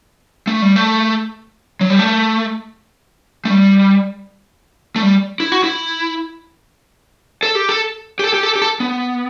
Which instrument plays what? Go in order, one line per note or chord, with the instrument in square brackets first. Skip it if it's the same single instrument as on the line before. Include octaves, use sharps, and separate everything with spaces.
[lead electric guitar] A3
G3
A3
F#3
G3
A3
A3
G3
A3
G3
E4
F#4
E4
A4
G4
A4
G4
A4
G4
A4
G4
A4
B3